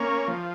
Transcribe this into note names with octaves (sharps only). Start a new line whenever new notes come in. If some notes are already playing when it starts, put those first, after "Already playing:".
Already playing: A#3 C#4
F3